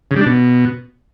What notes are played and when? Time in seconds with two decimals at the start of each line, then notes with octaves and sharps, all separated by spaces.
0.11 C#3
0.16 G3
0.21 D4
0.26 B2